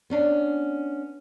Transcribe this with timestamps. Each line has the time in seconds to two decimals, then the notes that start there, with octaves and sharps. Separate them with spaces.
0.10 B3 C#4 D4